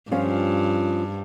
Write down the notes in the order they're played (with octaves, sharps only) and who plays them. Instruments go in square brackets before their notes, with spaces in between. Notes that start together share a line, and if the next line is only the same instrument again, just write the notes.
[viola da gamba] G2 [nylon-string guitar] F3 C#4 F4